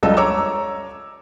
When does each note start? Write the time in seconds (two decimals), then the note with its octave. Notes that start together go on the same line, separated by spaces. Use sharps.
0.03 F#1 C#2 G3 A4 D#5 E6
0.17 C#5 A#5 D6 E6